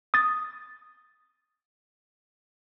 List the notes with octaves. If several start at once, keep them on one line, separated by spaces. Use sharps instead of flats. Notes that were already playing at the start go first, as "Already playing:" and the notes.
D#6 A6